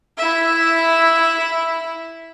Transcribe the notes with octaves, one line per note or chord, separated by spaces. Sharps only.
E4 E5